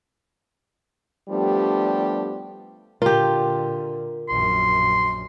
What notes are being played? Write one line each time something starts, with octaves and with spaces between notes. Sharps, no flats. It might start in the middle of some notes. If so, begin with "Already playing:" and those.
F3 G3 A3 B3 D4 G4
A#2 D3 F4 G4 A#4
A#1 F#2 C6